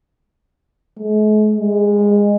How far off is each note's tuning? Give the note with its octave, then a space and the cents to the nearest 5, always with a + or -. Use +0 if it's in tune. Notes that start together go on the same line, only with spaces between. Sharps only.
G#3 +45
G#3 -20